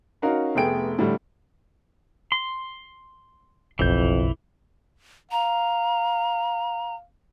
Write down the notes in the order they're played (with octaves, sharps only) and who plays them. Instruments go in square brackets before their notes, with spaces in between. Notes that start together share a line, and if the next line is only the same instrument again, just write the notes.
[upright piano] C#4 D#4 F#4 A#4 F5
F1 A3 B3 G#4 G5 D7
A2 D3 G3
[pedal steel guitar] C6
[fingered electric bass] F#1 B1 [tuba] F2 [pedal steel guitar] E3 G6
[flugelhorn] F5 [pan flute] A#5